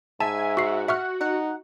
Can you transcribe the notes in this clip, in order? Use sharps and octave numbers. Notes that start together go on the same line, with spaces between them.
G#2 E5 G#5 A5
F#4 C#6 C7
E5 F#5 C#6 F6
D#4 F#5